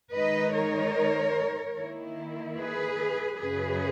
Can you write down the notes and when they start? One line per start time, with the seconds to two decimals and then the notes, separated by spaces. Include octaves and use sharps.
0.13 D#3 G#3 D#4 B4 D#5
0.54 A#4 C#5
1.77 D#3 A#3 E4
2.58 G#4 B4
3.39 F#2 C#3 F#3 C#4 G#4 B4